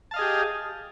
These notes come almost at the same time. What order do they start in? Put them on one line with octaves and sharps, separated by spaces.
A5 F5 D#5 G#4 G4